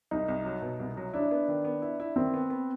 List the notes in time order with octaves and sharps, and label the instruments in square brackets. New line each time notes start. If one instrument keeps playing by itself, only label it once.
[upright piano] C2 [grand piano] D#4
[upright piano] C2
F#3
B2
C2
F#3
[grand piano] D4 [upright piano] E4
[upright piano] B3
D#3
B3
E4
E4
[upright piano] D#3 [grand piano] C4
[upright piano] B3
B3